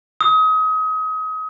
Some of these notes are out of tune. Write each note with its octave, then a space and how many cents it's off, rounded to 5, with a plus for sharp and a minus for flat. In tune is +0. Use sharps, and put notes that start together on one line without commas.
D#6 +30